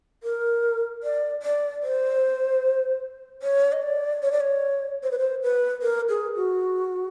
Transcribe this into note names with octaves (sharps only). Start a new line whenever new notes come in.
A#4
D5
D5
C5
C#5
D#5
D5
C#5
D5
C#5
C5
B4
C5
B4
A#4
G#4
F#4